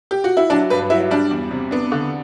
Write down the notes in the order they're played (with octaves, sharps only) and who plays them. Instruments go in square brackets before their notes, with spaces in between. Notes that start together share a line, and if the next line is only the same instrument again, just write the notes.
[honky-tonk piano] G4
F#4
E4
[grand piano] F#3 [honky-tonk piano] D4
[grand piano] G2 [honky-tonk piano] B4
[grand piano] F#3 [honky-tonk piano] E4
[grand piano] G3 [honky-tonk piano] D4
[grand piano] E2
C3
[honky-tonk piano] B3 [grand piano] D4
[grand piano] D3